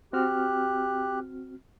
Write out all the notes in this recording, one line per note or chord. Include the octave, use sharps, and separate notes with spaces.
C4 F#4 G4 F6 F#6